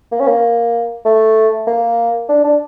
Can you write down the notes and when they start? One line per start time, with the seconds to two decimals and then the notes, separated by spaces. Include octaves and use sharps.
0.12 A#3
0.20 C#4
0.27 A#3
1.05 A3
1.67 A#3
2.29 D4
2.44 D4